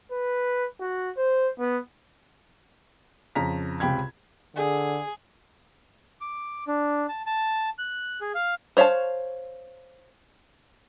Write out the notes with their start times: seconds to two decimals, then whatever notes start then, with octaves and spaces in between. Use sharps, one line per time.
0.12 B4
0.80 F#4
1.17 C5
1.59 B3
3.35 F2 C#3 A#5 B6
3.80 C#2 C3 G5 B5 G#6
4.56 D3 G#4
6.21 D6
6.67 D4
7.09 A5
7.26 A5
7.78 F#6
8.21 G#4
8.35 F5
8.77 C5 C#5 E5 F5 A5